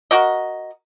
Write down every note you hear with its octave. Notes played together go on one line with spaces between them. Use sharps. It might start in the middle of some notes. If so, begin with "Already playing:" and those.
F#4 A#4 D#5